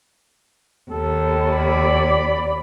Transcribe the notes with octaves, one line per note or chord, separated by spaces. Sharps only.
D#2 A4
D5 B5